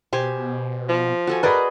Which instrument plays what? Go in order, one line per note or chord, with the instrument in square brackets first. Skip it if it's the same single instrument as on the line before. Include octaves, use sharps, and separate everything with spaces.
[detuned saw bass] B2 [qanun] G4 C5 G#5
[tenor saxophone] F3
[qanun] F#4 A4 G#5
[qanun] G#4 D5 D#5 [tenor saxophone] A#4 [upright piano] B4 B5